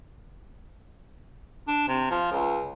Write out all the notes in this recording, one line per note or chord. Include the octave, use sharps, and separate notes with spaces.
D4
C3
F3
C#2